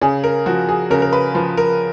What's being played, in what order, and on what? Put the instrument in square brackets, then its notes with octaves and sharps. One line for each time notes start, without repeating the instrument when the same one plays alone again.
[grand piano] C#3 G#4
A#4
F3 F#4
G#4
C#3 A#4
A#4
B4
F3 B4
A#4